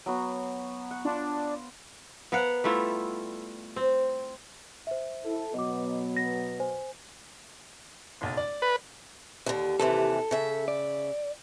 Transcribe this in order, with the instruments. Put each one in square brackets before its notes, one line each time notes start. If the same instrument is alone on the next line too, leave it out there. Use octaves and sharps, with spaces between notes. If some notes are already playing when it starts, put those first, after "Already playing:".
[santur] F#3 B3 F#4
F#5
[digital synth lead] D4 [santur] F4
[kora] B3 A#4 F5 F#5
G3 A3 E4 F4
C4
[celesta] C5 E5
[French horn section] E4 A4
[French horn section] B2 F#3 B3 [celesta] D#5 D6
[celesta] A#6
C5 G#5
[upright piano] F#1 B1 A6
D5
[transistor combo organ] B4
[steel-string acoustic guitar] D#2 D3
[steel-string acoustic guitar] D#2 C3 E3 [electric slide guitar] A4
[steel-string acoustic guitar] C#3 E5
[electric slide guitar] D5